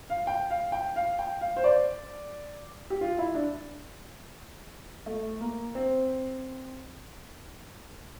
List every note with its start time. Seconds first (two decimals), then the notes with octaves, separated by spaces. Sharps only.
0.10 F5
0.27 G5
0.50 F5
0.72 G5
0.96 F5
1.19 G5
1.41 F5
1.56 C5
1.64 D5
2.90 G4
3.01 F4
3.19 E4
3.35 D4
5.06 A3
5.41 A#3
5.75 C4